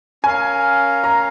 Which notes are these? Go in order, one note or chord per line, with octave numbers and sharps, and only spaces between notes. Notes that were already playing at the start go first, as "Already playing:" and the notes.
C#4 A#4 F5 G#5
A#5